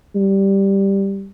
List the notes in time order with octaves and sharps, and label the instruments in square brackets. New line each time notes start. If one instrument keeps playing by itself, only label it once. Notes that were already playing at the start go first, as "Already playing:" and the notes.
[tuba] G3